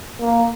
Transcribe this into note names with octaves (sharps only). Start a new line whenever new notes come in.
A#3